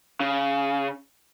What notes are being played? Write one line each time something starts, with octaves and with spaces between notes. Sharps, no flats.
C#3